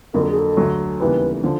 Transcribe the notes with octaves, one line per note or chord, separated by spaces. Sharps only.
F2 D3 F#3 A#3 A#4
A4
G#4
A4
D2 D3 F#3
D#2 C#3 E3 G3 B3 B4
D3 F3